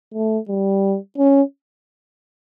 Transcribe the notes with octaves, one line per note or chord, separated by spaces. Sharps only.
A3
G3
C#4